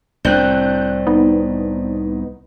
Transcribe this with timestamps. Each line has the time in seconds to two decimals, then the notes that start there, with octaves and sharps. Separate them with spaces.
0.25 C2 A2 C4 D4 F#6 G6
1.07 B3 D#4